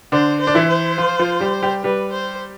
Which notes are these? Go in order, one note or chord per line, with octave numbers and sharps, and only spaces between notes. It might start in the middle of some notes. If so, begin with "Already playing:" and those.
D3 D4 C5
C5
D4
E3 E4
C5
F3 F4
F3 F4
G3 G4
G3 G4
G3 G4 B4
C5